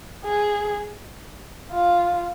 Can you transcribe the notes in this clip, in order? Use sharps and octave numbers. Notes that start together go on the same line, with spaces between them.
G#4
F4